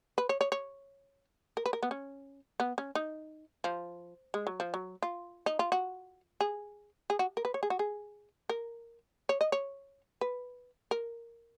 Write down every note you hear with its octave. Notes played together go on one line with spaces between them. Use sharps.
B4
C#5
C#5
C#5
A#4
B4
A#4
B3
C#4
B3
C#4
D#4
F3
G#3
F#3
F3
F#3
F4
D#4
F4
F#4
G#4
G#4
F#4
A#4
B4
C#5
G#4
F#4
G#4
A#4
C#5
D#5
C#5
B4
A#4